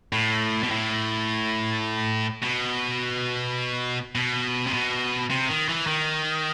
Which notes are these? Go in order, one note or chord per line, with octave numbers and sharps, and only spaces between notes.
A2
B2
A2
B2
B2
C3
B2
C3
D#3
E3
D#3